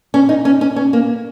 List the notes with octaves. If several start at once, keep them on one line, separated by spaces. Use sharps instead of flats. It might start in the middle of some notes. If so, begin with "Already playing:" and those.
C#4
D#4
C#4
C#4
C#4
A#3